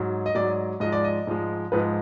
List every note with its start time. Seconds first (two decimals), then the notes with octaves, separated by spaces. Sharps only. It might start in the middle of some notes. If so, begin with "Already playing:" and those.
Already playing: G#2 F#3
0.26 D#5
0.35 G#2 F#3 D5
0.80 G#2 F3 G#3 D#5
0.92 D5
1.04 D#5
1.27 G#2 F3 G#3
1.72 G#2 F3 G#3 B4